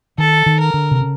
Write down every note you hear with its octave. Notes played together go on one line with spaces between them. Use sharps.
D#3 A4
D#3
A#4
D3
C3
C#3